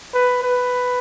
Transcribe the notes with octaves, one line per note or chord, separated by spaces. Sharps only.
B4
B4